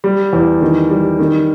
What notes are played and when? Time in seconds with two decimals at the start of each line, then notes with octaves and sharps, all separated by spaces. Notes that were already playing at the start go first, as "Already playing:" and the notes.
0.04 G3
0.33 E2
0.62 D#3
0.91 G3
1.19 D#3